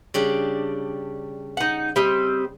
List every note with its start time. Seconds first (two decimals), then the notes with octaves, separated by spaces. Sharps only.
0.14 C#3 G3 D4
1.57 D#4 F#5
1.96 G3 C4 D#5